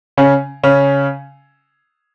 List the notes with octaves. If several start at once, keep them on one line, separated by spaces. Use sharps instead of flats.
C#3 C#4
C#3 C#4